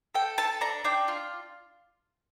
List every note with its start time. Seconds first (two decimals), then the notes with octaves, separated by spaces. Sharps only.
0.15 A4 G5
0.38 A4 A5
0.61 D4 A#5
0.85 D4 G5
1.08 F4